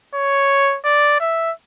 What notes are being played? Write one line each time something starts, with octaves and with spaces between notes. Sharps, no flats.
C#5
D5
E5